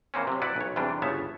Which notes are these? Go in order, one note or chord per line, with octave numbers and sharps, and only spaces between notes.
E3 A#3 C4 C#4
C3 F#3
E4 B4 D5 F#5
B1 C#5
E2 C3 E3 G3 D4
G1 C#3 B3 C#5 E5 A5